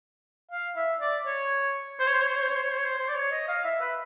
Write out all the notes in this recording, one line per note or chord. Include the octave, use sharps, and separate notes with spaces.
F5
E5
D5
C#5
C5
C#5
C5
C#5
C5
C#5
C5
C#5
C5
C#5
C5
C#5
C5
C5
D5
C#5
D#5
F5
E5
B4